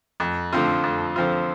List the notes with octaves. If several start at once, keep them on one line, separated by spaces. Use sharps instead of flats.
F2
D3 F3 C4 F4
F2
D3 F3 C4 F4